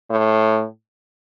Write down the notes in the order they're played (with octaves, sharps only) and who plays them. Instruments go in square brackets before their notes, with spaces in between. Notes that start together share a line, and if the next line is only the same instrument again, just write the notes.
[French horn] A2